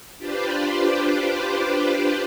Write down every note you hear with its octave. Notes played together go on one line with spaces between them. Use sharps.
D4 F4 G4 B4 C5 D5